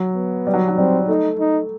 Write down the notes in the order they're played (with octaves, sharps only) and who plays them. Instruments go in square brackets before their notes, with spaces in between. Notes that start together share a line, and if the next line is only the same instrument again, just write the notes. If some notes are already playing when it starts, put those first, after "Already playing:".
Already playing: [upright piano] F#3
[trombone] B3
[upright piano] G3
F#3
F#3
[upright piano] G3 [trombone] C4
[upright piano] A3 [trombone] D#4
[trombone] D#4